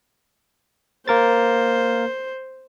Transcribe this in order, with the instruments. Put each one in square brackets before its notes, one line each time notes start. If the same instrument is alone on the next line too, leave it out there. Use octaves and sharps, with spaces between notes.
[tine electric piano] A#3 A#4 A6 [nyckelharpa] C5